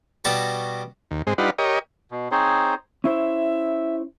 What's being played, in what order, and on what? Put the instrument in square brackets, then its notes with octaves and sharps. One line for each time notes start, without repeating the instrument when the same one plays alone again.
[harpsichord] B2 G3 F#4 A5 C#6
[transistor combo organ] D#2
G#2 G#3 C4
G3 D4 D#4 F4 B4 F#5
G4 A#4 C#5 D#5
[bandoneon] B2
C4 D#4 G#4 C5 C#5
[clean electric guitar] C#4 E4 C5 [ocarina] E5